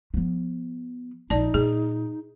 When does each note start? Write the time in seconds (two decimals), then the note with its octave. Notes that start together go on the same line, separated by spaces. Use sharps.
0.14 F3 B3
1.30 A#1 D#4 D5 A5
1.54 A#2 G#4